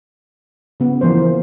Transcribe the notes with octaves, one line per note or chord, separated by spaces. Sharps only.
C#3 B3
E3 F3 A#3 C5